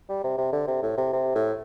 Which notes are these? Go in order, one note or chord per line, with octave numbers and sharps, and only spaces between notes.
G3
C3
C3
D3
C3
A2
C3
C3
A2